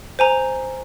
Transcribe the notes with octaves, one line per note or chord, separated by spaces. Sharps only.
C5 G#5 A#5